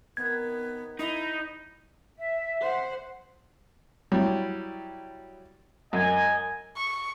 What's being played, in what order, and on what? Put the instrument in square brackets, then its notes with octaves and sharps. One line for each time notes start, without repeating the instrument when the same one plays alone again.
[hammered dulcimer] C3 D#3 [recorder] B3 [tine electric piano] G#6
[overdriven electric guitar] D#4 [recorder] E4
[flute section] E5
[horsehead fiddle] C5 F#5
[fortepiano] F#3 G3 E4
[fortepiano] F#2 [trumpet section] D#5 G#5
[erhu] C#6